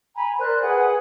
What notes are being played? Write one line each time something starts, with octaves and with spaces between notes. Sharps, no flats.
G#5 A#5 B5
A#4 C5 D5 F#6
G#4 B4 F#5 G#5